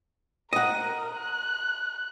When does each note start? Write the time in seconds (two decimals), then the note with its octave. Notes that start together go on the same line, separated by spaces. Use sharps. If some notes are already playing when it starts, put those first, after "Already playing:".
0.53 A#4 D#5 F#5
1.16 F#6